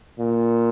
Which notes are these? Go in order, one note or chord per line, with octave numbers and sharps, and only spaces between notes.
A#2